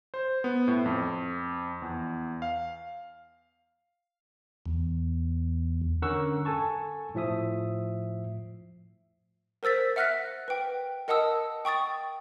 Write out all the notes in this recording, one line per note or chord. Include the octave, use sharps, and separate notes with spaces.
C5
B3
A2
F2
E2
F5
E2
D3 C#4 A#4 F#5 C#6 E6
A4 G#5 A5 C#6
A2 F3 E5 D#6
A#4 C5 E6 A6 B6
E5 F#5 F6 F#6 A#6 B6
B4 G5
A#4 D#5 F#5 A5 D#6 E6
G5 C#6 D#6 A6